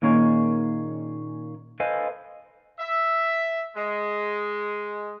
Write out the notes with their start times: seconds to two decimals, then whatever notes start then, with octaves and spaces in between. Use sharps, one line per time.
0.02 A#2 D#3 A#3 C#4 G#4
1.80 A4 B4 C5 D#5 F5 G#5
2.79 E5
3.76 G#3